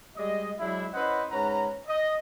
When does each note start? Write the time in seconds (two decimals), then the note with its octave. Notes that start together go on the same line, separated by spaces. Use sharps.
0.17 G3 G#3 D5 D#5
0.59 F#3 G#3 D4 E4
0.94 C#4 E4 B4 C5 D#5 F#5
1.32 G#2 C#4 B4 F#5 A#5
1.88 D#5